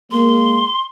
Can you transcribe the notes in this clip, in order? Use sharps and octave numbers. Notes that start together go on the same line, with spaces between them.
G#3 A#3 C6